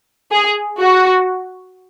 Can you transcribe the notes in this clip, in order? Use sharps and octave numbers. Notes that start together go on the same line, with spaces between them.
G#4
F#4